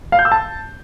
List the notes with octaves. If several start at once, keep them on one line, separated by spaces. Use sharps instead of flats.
F5
G6
E6
A5